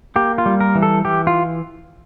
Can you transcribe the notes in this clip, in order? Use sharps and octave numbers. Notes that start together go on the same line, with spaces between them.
A#3 G4
F4
G3
A#4
E3
A4
E3 G4
F4